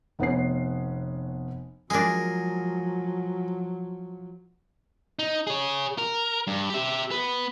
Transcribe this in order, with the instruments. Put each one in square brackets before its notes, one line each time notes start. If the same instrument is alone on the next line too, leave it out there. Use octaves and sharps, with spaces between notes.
[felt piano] F1 B3 C#4 C7
[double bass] F3 F#3 [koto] G#3 D4 [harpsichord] G#4 A#4
[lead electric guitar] D#4
G#4 C#5
A#4
G2
G4 E5
B3 B4